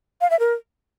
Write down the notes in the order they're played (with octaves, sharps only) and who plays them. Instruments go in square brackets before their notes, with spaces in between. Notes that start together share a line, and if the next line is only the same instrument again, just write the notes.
[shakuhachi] F5
E5
A#4